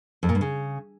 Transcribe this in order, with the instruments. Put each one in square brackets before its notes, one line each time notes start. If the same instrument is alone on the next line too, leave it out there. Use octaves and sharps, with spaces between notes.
[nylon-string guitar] F2
A#2
G2
C#3